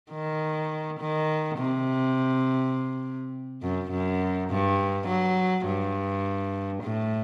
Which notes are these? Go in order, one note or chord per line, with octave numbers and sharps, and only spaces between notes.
D#3
D#3
C3
F#2
F#2
G2
F#3
G2
A2